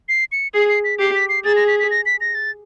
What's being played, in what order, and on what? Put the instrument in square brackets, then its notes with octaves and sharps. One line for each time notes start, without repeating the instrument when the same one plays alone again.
[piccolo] C7
C#7
[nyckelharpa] G#4 [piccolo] C7
[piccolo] C7
B6
[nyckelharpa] G4 [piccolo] C7
[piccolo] B6
C7
[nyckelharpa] G#4 [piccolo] A6
[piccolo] A#6
B6
B6
A#6
B6
A#6
A6